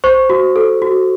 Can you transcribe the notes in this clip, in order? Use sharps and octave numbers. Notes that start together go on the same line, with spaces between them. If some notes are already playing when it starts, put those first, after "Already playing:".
C5 C#6
F#4
A4
F#4